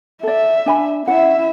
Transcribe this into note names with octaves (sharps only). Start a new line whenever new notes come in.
A4 D5 E5
D4 G#5 B5
C#4 E4 E5 F#5